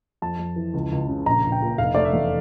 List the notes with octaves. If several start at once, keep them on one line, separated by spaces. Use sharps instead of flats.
F2 A5
F2
E3
C#2
C#2
C#3
A#1 A#5
A#1
G5
A#2
F1 F5
A3 D5
E5
E2